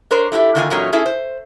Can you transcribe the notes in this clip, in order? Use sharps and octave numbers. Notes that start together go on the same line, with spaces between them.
D4 A#4 C5 C#5
A3 E4 F#4 G4
D3 D#3 A#3 F4 F#5 G#5
E2 A#2 F#3 A3 C#4 D#4
A3 C#4 E4 G#4 A4
C5